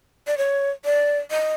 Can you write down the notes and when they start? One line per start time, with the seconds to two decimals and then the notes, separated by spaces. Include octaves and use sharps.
0.27 D5
0.38 C#5
0.85 D5
1.31 D#5